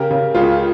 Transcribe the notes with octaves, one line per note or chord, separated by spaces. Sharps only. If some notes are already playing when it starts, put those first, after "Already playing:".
Already playing: C#3 G4 A#4
C#3
C#2 F4 G#4